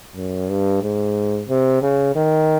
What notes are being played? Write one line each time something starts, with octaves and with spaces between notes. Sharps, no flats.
F#2
G2
G#2
C3
C#3
D#3